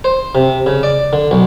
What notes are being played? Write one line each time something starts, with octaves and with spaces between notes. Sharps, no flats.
C5
C3
C#3
D5
D3
B1